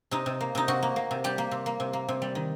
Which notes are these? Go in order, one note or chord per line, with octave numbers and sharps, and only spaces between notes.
C3 D#4
C3
A#3
C3 D#4
C3 F#4
A#3
A#3
C3
G3 G4
A#3
C3
A#3
C3
A#3
C3
G3
D#3